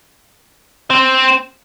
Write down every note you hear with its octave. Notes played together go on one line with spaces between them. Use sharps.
C4